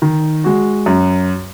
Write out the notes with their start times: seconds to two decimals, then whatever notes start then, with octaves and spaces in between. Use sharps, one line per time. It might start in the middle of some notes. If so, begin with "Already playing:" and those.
0.02 D#3
0.44 G#3 F#4
0.86 F#2